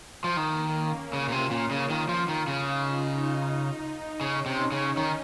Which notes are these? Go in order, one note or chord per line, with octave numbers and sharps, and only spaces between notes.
F3
D#3 A#3
C#4
C#3 F4
A#2
C3
A#2
C#3
D#3
F3
D#3
C#3
D#4
C#3 C#4
C3
C#3
D#3